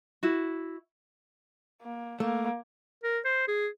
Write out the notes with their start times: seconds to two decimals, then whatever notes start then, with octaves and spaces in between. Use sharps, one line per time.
0.23 E4 F#4
1.82 A#3
2.20 A3 A#3
3.04 A#4
3.25 C5
3.48 G#4